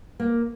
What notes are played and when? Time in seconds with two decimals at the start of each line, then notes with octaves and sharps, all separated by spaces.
0.20 A#3